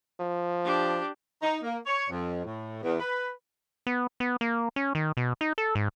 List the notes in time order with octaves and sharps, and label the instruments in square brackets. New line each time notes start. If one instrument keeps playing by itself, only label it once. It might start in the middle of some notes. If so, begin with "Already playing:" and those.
[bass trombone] F3
[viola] D4 G4
[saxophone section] D#4
A#3
C#5
F2
A2
E2
B4
[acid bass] B3
B3
A#3
C#4
D#3
B2
D#4
A4
G#2